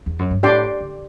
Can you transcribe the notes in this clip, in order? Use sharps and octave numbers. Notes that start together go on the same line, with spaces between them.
E2
F#2
G2
A2 D4 G4 D5 G5 C6
D3